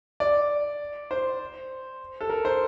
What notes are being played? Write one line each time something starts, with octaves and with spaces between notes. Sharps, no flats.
D5
C5
A4
A#4
C5